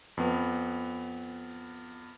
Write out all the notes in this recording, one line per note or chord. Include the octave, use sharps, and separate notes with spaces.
F2 B3